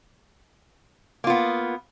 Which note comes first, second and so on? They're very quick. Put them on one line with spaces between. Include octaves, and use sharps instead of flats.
A#3 F4 B3